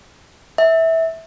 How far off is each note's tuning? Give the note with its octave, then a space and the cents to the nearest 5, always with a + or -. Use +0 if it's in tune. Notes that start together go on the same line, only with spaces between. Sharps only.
E5 -15